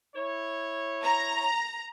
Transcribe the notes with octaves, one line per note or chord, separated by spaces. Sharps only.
E4 C#5
A#5